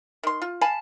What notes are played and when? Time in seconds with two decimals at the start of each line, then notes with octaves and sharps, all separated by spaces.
0.23 D#3 C6
0.42 F4
0.61 F5 G#5 A5 B5